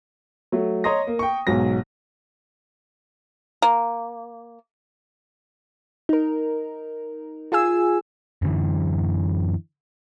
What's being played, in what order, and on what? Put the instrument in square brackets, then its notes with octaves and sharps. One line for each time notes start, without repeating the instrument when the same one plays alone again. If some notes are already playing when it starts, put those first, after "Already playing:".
[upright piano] F#3 A3
C#5 D#5 A#5 C6 D#6 A#6
A#3
G5 C#6
B1 G#2 F#3 A#6
[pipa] A#3
[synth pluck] D#4 A#4
F4 G#4 G#5 E6
[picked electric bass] F#2 D3 E3